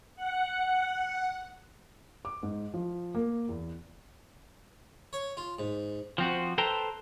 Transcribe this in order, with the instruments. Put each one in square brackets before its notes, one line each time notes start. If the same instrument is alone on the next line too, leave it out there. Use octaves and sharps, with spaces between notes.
[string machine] F#5
[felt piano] D6
G#2
F3
A#3
E2
[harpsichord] C#5
F4
G#2
[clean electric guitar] F3 C4 F#4
A4 B4 C5 G5 A5 A#5